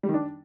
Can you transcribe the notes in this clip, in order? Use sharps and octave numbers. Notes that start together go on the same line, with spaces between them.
G3
D#3
D4